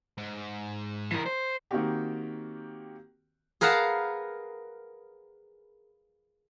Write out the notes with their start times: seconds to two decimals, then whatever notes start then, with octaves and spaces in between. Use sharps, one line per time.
0.18 G#2
1.12 E3 A#4
1.26 C5
1.71 D#3 A#3 C4 F#4 G4
3.61 G#4 A#4 B4 F5 F#5 A5